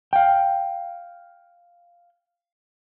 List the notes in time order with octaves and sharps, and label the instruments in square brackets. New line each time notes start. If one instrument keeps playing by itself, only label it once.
[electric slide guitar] F5 G5